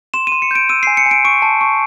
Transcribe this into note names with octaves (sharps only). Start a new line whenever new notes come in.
C6 E7
D#7
C6
C#7
G6 D7
E6 D#7
C7
G#5
C#7
G#5
D7
C#6 D7
A5
C#6